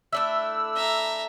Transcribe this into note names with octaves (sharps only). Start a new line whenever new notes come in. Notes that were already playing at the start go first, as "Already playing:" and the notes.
A3 D4 E4 E6
E5 A#5